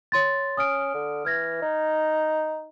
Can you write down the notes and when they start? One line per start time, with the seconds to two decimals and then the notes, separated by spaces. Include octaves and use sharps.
0.12 C#5 C6 A6
0.57 C#4 D#6 F6 D7
0.94 D3
1.25 E3 F6 G#6 A#6
1.62 D#4